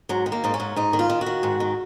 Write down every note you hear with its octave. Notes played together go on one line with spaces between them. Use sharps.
G#2 F#3
D#3
A#3
G#2 D#4
C#4
G#2
G#2 D#4
D#3
F4
D#3
F#4
D#3
G#2
D#3